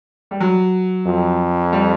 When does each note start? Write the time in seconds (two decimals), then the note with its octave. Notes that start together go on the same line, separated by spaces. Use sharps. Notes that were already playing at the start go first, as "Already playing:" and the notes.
0.31 G3
0.40 F#3
1.06 F2
1.73 G3